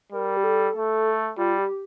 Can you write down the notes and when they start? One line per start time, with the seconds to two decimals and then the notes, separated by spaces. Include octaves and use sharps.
0.12 G3 A#4
0.37 G4
0.44 A4
0.75 A3
1.37 G3 F4
1.59 G4